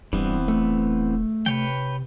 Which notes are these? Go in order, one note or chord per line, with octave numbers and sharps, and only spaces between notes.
D#1 G2 E3 B3 C4
A3
C3 B4 C#5 G5